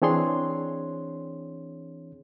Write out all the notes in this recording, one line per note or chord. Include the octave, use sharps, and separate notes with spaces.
E3 C4 D4 G#4 C#5 C6